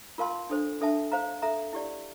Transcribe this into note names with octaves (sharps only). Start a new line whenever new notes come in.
F4 A#4 F5 A5 C6
D4 A4 C5
D4 A4 E5 A5
C5 F5 A#5
A4 E5 A#5
E4 G4 D5